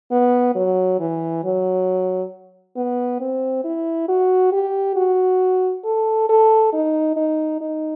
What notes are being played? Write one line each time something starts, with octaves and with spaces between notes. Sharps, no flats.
B3
F#3
E3
F#3
B3
C4
E4
F#4
G4
F#4
A4
A4
D#4
D#4
D#4